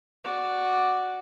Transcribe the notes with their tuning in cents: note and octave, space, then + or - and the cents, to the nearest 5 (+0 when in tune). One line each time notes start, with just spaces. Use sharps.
F#4 +0 D5 +0